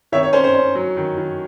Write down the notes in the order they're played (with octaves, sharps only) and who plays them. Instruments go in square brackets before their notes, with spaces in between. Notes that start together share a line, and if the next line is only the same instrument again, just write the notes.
[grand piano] D#3 [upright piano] C#5 E5
[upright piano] C#5
[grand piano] C#4 [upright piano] C5
[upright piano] C5
[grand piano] C#4
F#3
D#3
D#3